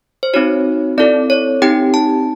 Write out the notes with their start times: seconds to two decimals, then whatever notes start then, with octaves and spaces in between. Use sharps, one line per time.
0.23 C5
0.34 C4 D#4 F#4 C#5
0.98 C4 E4 A4 D5
1.30 C#5
1.62 C4 D#4 G4 G5
1.94 A5